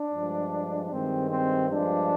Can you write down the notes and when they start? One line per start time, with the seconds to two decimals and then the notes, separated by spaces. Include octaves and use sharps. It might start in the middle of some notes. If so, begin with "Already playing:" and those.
Already playing: D4
0.12 G2 F3 G#3
0.90 G2 D#3 G#3 C4
1.30 C4
1.69 G2 F3 G#3 D4